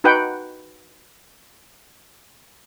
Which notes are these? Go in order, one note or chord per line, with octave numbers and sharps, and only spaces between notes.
D#4 F#4 B4 F#5 G5